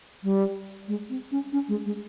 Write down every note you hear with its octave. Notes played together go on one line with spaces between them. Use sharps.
G3
G#3
C4
C#4
C#4
G#3
G#3